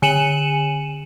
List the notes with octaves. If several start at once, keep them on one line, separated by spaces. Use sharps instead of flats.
D3 G#5 C#7 D#7 E7 F#7